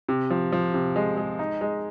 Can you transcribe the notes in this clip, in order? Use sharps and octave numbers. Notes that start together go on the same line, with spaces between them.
C3
F3
F3
C3
G#3
G#3
D#4
G#3